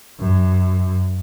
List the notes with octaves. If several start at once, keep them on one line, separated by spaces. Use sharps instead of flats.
F#2